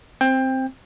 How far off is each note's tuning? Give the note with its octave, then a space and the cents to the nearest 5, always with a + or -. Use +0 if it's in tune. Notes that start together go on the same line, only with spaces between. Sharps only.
C4 +0 G5 +20